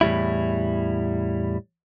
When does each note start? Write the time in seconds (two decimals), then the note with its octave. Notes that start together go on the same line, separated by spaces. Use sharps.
0.01 E2 A2 G3 E4